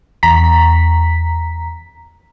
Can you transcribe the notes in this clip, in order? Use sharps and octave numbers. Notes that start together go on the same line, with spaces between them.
E2 A#5 B6